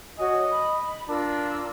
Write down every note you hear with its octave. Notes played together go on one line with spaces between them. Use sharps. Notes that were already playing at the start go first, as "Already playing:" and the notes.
F#4 C#5 D#5 G#5
B5
D4 F4 A#4 E6